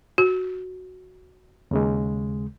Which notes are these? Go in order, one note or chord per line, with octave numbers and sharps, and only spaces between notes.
F#4
D#2 C#3 G#3